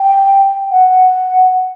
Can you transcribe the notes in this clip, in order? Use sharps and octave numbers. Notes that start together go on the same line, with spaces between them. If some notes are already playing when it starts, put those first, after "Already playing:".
Already playing: G5
F#5